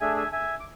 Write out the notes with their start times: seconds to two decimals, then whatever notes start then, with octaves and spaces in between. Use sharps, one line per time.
0.01 A3 D4 G#4 E5 G#5
0.16 E5 G#5
0.33 E5 G#5
0.60 D6